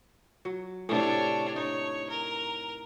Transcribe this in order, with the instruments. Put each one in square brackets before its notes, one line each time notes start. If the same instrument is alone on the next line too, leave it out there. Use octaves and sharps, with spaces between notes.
[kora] F#3
[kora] A2 C3 [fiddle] D4 C#5
[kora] D#4 [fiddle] C#5
[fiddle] A#4